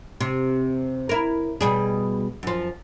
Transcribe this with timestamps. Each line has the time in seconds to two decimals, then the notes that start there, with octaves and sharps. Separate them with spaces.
0.20 C3
1.09 E4 A#4
1.61 B2 G3 G#4
2.43 F#2 F3